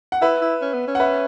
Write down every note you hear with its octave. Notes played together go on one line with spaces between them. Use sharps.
F#5
E4 B4 E5
E4
C#4
B3
C#4
F#5
B4 E5